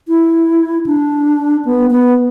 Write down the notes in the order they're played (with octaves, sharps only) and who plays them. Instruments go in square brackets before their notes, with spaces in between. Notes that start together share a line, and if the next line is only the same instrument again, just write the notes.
[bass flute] E4
D4
B3
B3